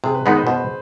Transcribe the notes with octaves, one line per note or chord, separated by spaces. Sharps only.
C3 G#4
B4
D#3 G#3 B3 D#4 B4
C5
B2 C5